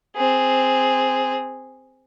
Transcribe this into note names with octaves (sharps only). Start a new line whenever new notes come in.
C4 G#4